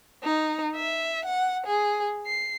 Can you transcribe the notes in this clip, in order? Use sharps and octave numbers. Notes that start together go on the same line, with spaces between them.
D#4
E5
F#5
G#4
C7